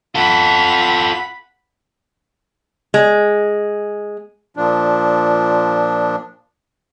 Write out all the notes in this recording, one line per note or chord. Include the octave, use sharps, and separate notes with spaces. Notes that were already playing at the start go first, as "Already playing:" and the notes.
F4 A4 F#5 B5
G#3
A#2 F3 D4